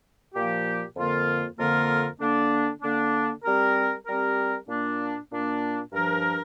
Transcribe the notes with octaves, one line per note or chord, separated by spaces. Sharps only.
A#2 F3 A#3 G4
F2 D3 A#3 F4 A#4
F2 D3 A#3 F4 A#4
D3 A#3 D4
D3 A#3 D4
G3 C4 G4 A#4
G3 C4 G4 A#4
A#2 A#3 D4
A#2 A#3 D4
G2 F3 D4 A#4